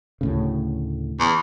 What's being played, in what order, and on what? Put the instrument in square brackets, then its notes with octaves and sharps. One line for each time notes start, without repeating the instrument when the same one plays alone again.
[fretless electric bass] D2 A2 C#3
[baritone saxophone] E2